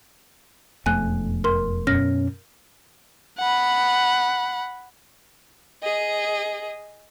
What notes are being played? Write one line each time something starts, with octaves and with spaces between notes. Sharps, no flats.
E1 F2 A3 G#5 F#6
A#4 C6
F#2 B2 C#4 F6 A#6
F#5 B5
G#4 D#5